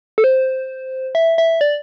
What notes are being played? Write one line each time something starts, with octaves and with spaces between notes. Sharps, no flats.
A4
C5
E5
E5
D5